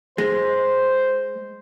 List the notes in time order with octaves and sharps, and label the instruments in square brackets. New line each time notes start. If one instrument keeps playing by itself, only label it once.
[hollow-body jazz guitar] G#3 [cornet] C5